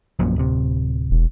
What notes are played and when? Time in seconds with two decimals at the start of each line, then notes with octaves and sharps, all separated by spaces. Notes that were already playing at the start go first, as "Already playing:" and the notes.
0.19 A#1 F#2 A#2
0.36 D1 C3
1.11 E1